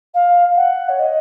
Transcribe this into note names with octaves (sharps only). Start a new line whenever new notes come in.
F5
F#5
C#5
D#5